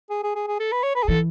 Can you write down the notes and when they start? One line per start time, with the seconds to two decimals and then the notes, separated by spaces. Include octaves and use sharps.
0.10 G#4
0.23 G#4
0.35 G#4
0.47 G#4
0.60 A4
0.72 B4
0.84 C#5
0.96 B4
1.03 G#4
1.08 E3 A4